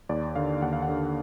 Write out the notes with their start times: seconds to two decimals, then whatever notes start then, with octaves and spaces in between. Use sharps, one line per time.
0.09 D#2 D5
0.36 D3 F5
0.62 D#2 F#5
0.73 F5
0.82 F#5
0.89 D3